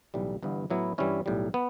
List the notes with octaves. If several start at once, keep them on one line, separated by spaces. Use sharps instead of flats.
B1 A2 E3 G3
G1 G2 E3 B3
A2 F#3 B3 E4
G2 E3 G3 C#4 E4
B1 A2 G3
B3